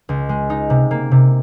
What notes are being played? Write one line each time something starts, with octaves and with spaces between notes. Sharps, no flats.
C#2
G#3
D#4
C3
A#3
C3